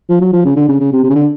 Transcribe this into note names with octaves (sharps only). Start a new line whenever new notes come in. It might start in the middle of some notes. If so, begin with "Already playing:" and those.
F3
F#3
F3
C#3
D3
C#3
C#3
C3
C3
C#3
D3